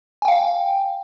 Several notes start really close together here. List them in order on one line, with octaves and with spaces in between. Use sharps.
G#5 G5 F5